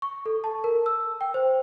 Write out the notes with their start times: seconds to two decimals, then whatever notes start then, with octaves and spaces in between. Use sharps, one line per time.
0.02 C#6
0.26 A4
0.44 A5
0.64 A#4
0.86 E6
1.21 G5
1.34 C5